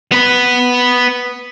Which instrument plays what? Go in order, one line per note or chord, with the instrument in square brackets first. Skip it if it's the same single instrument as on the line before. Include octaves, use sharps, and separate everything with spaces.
[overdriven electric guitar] B3 B4